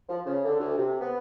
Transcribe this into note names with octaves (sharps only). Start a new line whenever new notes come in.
F3
C#3
D3
D2
C3
B3